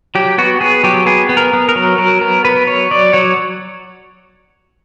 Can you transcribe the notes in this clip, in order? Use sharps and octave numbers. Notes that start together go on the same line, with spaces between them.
F#3 G4
B3 F#4
B3 G#4
F#3 G4
B3 G#4
B3
A#4
B3
A#4
F#3
F#3 A#4
B3 A#4
B3 B4
F#3 C#5
F#3 D5
F#3 C#5